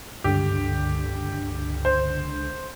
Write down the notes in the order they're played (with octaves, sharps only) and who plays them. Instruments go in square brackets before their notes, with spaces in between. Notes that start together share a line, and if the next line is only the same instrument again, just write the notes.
[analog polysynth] C#2 D3 [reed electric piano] G2 [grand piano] G4
[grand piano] C5